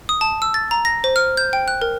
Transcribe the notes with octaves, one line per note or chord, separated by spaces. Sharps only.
D#6
A5
E6
A6
A#5
A#6
C5
F6
G6
G5
F#6
A#4